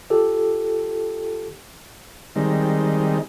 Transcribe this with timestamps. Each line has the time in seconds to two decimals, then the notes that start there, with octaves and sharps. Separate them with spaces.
0.10 F4 G4 A4
2.36 D#3 G3 G#3 C4 D#4